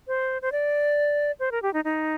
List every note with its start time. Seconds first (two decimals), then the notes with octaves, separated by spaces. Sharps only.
0.07 C5
0.42 C5
0.52 D5
1.40 C5
1.52 A#4
1.62 G4
1.73 D#4
1.85 D#4